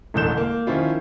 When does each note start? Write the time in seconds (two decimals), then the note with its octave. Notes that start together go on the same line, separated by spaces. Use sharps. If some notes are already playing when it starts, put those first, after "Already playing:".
0.14 E1 A1 D3 G6 E7
0.37 A#3
0.67 D#3 F3 C#4 E4 F4